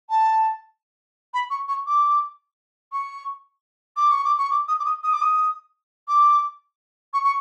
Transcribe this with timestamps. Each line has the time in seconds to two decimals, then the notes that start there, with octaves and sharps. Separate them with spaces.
0.10 A5
1.34 B5
1.50 C#6
1.68 C#6
1.87 D6
2.92 C#6
3.97 D6
4.11 C#6
4.25 D6
4.38 C#6
4.51 D6
4.68 D#6
4.80 D6
4.85 D#6
5.03 D#6
5.13 D6
5.22 D#6
6.08 D6
7.13 C#6
7.24 C#6